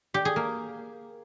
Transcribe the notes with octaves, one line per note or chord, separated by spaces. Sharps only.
G4
G#4
A#3